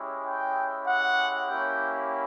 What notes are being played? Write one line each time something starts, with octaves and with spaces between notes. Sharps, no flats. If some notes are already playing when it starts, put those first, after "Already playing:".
Already playing: G#3 C#4 E4 G4
G5
F#5
A#3 C#4 E4 G4 G5